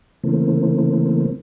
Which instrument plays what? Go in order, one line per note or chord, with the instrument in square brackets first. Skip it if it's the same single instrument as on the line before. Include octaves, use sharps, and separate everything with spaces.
[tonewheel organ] C#3 E3 A3 A#3 C4